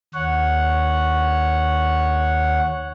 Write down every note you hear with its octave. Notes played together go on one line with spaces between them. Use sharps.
D#2 C#5 F#5